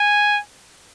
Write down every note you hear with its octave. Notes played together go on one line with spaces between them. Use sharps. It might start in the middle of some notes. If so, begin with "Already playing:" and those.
Already playing: G#5